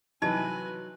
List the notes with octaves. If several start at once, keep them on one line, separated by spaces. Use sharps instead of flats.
C3 E3 F#3 D#4 B4 D#5 G#5 A5